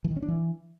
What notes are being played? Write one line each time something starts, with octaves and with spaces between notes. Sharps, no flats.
E3
D#3
C#4
D4
E3